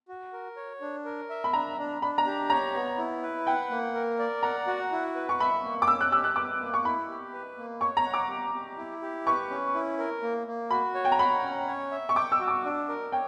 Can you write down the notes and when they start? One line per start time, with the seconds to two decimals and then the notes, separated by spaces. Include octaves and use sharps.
0.08 F#4
0.33 A#4
0.57 C#5
0.81 D4
1.05 A#4
1.30 E5
1.44 B5
1.53 D4 A#5
1.78 D4
2.02 D4 B5
2.18 A#5
2.26 G4
2.50 C#5 A#5
2.74 B3
2.98 E4
3.23 B4
3.47 F#5 G5
3.71 A#3
3.95 A#4
4.19 D5
4.43 F#5 A#5
4.67 F#4
4.92 E4
5.15 B4
5.29 C#6
5.40 E5 B5
5.64 A#3
5.82 D6
5.88 C#4 E6
6.01 F#6
6.12 G4 E6
6.24 F#6
6.36 B4 D6
6.61 A#3
6.74 C#6
6.85 E4 B5
7.09 G4
7.33 B4
7.57 A#3
7.81 C#5 C#6
7.97 A#5
8.06 F#5
8.14 D6
8.29 G4
8.54 G4
8.78 E4
9.02 G4
9.26 B4 C#6
9.50 C#4
9.75 E4
9.99 A#4
10.23 A#3
10.47 A#3
10.71 F#4 B5
10.95 C#5
11.05 G5
11.12 A#5
11.19 F#5 B5
11.43 C#4
11.68 C#5
11.91 E5
12.09 C#6
12.16 G5 D6
12.32 E6
12.40 F#4
12.48 D6
12.64 D4
12.88 A#4
13.12 C#5 G5